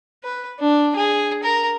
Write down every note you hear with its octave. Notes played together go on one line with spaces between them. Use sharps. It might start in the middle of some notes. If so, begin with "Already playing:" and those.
B4
D4
G#4
A#4